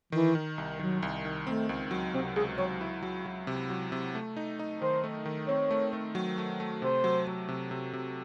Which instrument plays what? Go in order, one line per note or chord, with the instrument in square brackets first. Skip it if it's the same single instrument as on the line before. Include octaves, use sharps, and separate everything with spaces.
[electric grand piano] D#3 [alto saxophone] E3
[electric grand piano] D#3
C2
[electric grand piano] D#3 [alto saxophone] F#3
[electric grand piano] C2
D#3
[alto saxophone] A3 [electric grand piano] C4
[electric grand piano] C#2
F#3
[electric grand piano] C3 [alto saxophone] C4
[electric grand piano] C#2 [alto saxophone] G#4
[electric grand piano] F#3 [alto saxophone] C#5
[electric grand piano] E4
F#3
F#3
C3
F#3
C3
A3
D#4
D#4
[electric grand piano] D#3 [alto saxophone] C5
[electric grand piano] A3
D#3
[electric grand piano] C4 [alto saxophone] C#5
[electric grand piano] A3
A3
F#3
A3
A3
[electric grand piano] C3 [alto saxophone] C5
[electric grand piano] F#3
F#3
C3
C3
C3